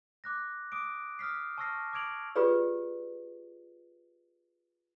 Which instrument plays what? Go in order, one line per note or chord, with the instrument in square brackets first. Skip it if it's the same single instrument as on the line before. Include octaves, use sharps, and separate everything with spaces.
[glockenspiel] D6 F#6 A#6
D6 D#6 D7
D#6 F6 B6 C7
A5 C#6 E6 F6 A#6 C7
D6 E6 G#6 D7 F7 F#7
[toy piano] F4 G4 G#4 B4 D5